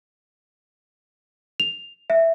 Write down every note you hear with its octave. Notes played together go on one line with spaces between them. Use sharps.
F7
E5